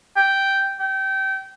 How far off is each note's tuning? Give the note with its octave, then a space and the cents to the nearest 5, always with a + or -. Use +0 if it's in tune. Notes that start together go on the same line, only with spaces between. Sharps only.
G5 -5
G5 -25